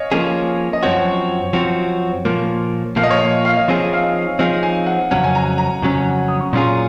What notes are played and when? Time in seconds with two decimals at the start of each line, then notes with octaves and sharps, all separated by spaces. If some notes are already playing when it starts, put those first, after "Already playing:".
Already playing: C#5 D#5 F5 G#5
0.12 F3 A#3 C#4 G#4
0.73 D#5
0.83 F#2 F3 C4 F#4 C#5
1.53 F#2 F3 C4 F#4
2.25 A#2 F3 A#3
2.96 A#2 F3 A#3 F5
3.03 D#5
3.10 C#5
3.18 D#5
3.45 F5
3.56 D#5
3.68 F3 C4 D#4 G#4 C#5
3.93 F5
4.04 D#5
4.39 F3 C4 D#4 G#4 F5
4.63 G#5
4.86 F#5
5.11 F2 C#3 F#3 C#4 F#5
5.24 G#5
5.35 A#5
5.58 A#5
5.82 F2 C#3 F#3 C#4
6.28 D#6
6.40 C#6
6.53 A#2 F#3 C#4 F4 G#4 C6